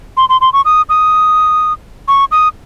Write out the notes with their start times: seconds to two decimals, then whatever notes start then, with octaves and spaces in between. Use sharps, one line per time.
0.17 C6
0.29 C6
0.41 C6
0.53 C#6
0.65 D#6
0.89 D#6
2.08 C#6
2.32 D#6